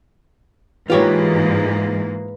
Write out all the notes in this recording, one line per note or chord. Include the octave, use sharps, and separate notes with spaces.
G#2 E3 A#3 F4 G4 B4 C#5